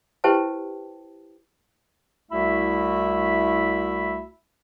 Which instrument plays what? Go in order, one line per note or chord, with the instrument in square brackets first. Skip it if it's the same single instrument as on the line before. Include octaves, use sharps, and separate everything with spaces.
[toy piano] E4 G4 B4 C5 G5 A5
[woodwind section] C2 A3 E4 F#4 E5 B5